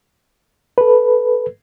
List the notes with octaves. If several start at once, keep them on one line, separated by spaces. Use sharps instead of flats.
A4 B4